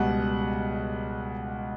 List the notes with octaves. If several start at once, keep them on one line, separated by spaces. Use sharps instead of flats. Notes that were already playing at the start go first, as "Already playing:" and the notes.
Already playing: C#2 B2 G3 F#5